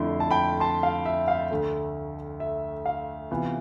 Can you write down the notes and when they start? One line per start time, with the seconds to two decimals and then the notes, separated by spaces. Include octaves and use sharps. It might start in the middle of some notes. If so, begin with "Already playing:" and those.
Already playing: F2 D3 A3 E4 C6
0.20 A5
0.31 G5 B5
0.60 A5 C6
0.83 F5
1.06 E5
1.28 F5
1.51 D2 D3 A3
2.40 E5
2.86 F5
3.30 C3 E3 B3 F4